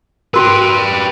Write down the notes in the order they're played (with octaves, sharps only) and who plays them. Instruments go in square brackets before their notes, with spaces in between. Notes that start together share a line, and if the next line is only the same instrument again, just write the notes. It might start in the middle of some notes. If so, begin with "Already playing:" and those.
[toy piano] F#4 A#4 [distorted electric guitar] G4 B4